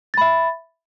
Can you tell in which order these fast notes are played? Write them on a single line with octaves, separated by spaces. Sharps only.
A6 B5 E5